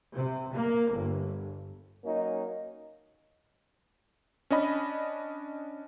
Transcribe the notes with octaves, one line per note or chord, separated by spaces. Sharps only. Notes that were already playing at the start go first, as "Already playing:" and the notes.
C3
A#3
G1
F#3 A#3 C#4 D#4
C#4 D4 D#5 B5